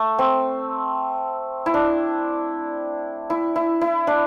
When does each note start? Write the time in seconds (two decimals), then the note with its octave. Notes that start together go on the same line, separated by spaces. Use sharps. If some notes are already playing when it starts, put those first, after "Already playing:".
Already playing: A3
0.19 C4
1.66 E4
1.74 D4
3.30 E4
3.56 E4
3.81 E4
4.07 D4